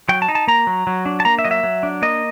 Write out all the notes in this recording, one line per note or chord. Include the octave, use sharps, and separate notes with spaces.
F#3 G5
A5
D#4
A5
A#3 A#5
F#3
F#3
D4
A5
A#3 A#5
E5
F#3 D#5
E5
F#3
D4
A#3 D#5